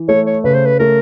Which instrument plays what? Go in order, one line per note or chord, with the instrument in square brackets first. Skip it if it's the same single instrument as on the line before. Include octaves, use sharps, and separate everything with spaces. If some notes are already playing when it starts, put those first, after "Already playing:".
Already playing: [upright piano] E3
[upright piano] A3 [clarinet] C#5
[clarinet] C#5
[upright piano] C#3 [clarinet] B4
[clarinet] C5
B4
[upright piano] A3 [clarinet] A#4